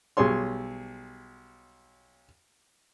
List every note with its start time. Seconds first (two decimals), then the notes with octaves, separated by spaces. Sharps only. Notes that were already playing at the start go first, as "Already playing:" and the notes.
0.17 B1 G3 G#4 C#5 C6